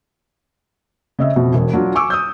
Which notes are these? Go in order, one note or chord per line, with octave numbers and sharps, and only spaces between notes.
C#3 D#5 E5
F2 B2
E1
F#3 D4 F4
G#5 C#6 D6 E6
D#6 E6 G6